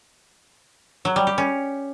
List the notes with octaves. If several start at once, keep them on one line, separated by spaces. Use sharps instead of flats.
F#3
G3
G4
C#4